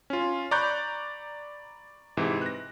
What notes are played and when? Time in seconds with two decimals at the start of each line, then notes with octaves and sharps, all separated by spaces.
0.10 C#4 F4
0.51 D5 A#5 B5 C#6 F#6 G6
2.17 G#2 C3 E3
2.42 F#6 A#6